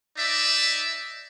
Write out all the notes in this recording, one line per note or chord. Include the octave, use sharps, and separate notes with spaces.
D#4 D5 E5